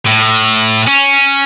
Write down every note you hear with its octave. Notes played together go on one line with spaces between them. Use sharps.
A2
C#4